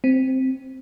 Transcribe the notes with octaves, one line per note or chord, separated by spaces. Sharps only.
C4